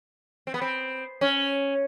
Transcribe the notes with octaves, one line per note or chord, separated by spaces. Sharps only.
C4
B3
C4
C#4